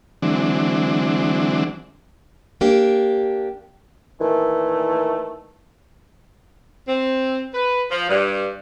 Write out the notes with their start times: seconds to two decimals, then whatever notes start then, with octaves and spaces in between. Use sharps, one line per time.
0.22 D3 E3 F#3 G#3 C4 D4
2.61 A#3 D4 G4
4.20 A#2 D#3 E3 A3
6.88 C4
7.54 B4
7.91 F3
8.09 G2